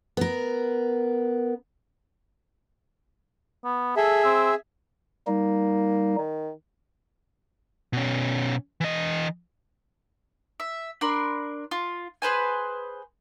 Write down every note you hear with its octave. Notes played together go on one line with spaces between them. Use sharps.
B3 A#4
B3
G#4 A4 E5
C4
G3 A#3 D#4
D#3
B2 C#4
E3 D#5
E5
D4 A#4 B5 C6
F4
G#4 B4 C5 G#5